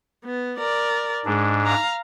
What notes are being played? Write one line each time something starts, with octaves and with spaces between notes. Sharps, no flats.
B3
A#4 D5
G#2 G#3 D4
F5 A#5